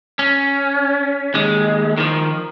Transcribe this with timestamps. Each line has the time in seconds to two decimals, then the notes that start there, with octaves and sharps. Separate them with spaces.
0.19 C#4
1.34 D#2 G#3
1.98 D#3 F3